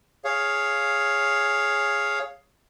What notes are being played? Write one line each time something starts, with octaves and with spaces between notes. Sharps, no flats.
G#4 C#5 F5